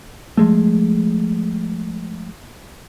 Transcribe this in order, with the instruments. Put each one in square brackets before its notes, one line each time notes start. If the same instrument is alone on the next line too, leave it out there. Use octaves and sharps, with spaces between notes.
[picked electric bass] F3 G#3 A3